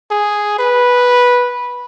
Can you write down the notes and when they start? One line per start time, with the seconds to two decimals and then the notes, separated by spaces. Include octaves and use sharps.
0.11 G#4
0.59 B4